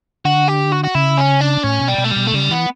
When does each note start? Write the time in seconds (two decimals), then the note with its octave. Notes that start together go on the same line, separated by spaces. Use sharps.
0.25 D3 F#4
0.48 G4
0.72 F#4
0.84 F#4
0.94 C#3 E4
1.18 C#4
1.41 D4
1.64 A2 C#4
1.81 B2
1.88 G3
1.98 B2
2.04 A3
2.11 G3
2.16 B2
2.27 A3
2.34 C#3 G3
2.51 E3 B3